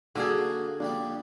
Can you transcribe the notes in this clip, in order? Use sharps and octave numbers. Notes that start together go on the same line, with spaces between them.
D3 A#3 F#4 G#4 D5
A#1 G3 D4 D5